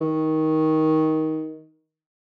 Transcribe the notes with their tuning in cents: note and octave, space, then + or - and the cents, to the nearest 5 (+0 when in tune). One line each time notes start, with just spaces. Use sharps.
D#3 +15